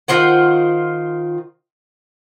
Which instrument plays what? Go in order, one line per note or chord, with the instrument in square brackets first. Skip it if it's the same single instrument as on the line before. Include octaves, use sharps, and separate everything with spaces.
[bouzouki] D#3 F4 C5 F#5